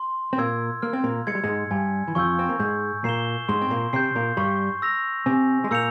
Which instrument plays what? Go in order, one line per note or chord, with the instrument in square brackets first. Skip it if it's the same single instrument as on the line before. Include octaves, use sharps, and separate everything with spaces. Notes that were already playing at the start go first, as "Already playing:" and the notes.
Already playing: [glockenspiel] C6
[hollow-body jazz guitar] C4
[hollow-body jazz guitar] A#2 A#3 [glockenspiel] E6 G#6
[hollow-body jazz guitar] A#3 [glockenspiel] F6
[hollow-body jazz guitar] C4
A#2 A#3
[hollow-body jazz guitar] G#3 [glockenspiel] G#6 C#7
[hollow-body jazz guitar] G3
G#2 G#3
[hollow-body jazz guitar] G2 G3 [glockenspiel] G#5
[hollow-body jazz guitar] E3
[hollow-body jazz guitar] F2 F3 [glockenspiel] C#6 E6 G6
[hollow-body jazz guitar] C4
A#3
[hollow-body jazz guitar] G#2 G#3 [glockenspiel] G6
[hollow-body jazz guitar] A#2 A#3 [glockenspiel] C7 E7 G7
[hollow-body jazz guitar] G#2 G#3 [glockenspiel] C6
[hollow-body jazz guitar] C4
A#2 A#3
[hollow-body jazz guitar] C3 C4 [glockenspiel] G6 C7
[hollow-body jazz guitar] A#2 A#3
[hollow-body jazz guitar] G2 G3 [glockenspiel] C#6
[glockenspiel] E6 A#6 F7
[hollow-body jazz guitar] C3 C4 [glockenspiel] G#5
[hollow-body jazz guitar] G#3
[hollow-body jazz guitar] A#2 A#3 [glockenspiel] E6 G6 C#7 F7